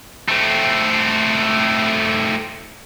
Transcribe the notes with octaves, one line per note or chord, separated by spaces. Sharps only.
A3 C4